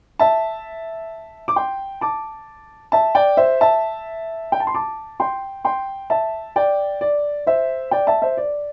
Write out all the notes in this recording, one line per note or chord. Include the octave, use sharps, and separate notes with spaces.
E5 A5
D6
G5 C6
A5 D6
E5 A5
D5 G5
C5 E5
E5 A5
G5
A5
C6
A5 D6
G5 C6
G5 C6
E5 A5
D5 G5
D5
C5 E5
D5 G5
E5 A5
C5 E5
D5